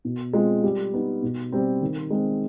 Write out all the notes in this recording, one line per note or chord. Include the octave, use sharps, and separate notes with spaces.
B2
G#3 C4 F4
G3
B3 D#4
B2
G3 C4
D#3
G#3 C4